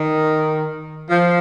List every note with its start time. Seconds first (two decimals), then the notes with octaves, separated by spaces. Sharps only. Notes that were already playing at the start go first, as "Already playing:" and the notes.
Already playing: D#3
1.10 F3